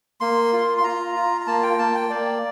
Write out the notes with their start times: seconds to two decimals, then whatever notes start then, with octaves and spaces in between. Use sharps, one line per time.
0.20 A#3 C6
0.53 F4
0.78 C6
0.84 F4 A#5
1.16 F4
1.41 A#5
1.47 A#3 A5
1.63 G5
1.79 A#3 A5
1.95 G5
2.10 A#3 D5